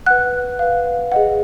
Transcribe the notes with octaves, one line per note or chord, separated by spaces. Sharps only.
B4 F#5 F#6
B4 F5
G#4 D#5 F#5